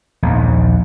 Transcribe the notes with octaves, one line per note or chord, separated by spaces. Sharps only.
A#1 D#2